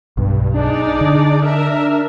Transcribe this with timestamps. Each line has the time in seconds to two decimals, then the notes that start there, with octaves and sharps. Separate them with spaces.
0.17 B1 G2
0.54 D4 D#4 G#4 D5
1.01 D3
1.45 A#4 E5